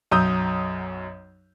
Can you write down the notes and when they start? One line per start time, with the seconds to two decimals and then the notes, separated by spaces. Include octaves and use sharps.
0.11 B1 F#2 A#5 D#6 E6 G6